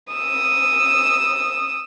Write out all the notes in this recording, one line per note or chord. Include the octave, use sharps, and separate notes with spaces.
D#6 E6